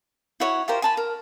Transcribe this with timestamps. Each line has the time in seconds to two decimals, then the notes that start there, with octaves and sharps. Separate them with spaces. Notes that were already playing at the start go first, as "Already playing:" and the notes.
0.40 E4 F#4 C#5 F#5
0.68 F4 G4 A#4 C5
0.82 G#5 A5 B5
0.97 A#4